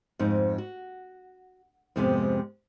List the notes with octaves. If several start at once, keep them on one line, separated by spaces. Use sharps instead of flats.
F2 G#2 D#4
F#4
F2 G#2 C3 G#3 B3 C4